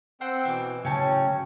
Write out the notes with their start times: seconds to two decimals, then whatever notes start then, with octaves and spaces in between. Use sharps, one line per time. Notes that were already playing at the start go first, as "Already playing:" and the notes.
0.21 C4 C5 F#5 G5 E6
0.45 B2 E3 C4 D6
0.85 A2 C#3 F#3 C#4 C#5 G5 A5